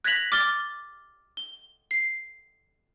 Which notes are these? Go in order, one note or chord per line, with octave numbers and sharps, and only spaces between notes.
F#6 G#6 A#6 B6 F7 F#7
D6 F6 A6 G7
G7
C7